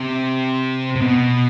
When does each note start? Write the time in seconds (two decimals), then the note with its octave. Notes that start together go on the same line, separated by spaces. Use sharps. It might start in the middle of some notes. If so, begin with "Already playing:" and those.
Already playing: C3
0.96 C3
1.02 B2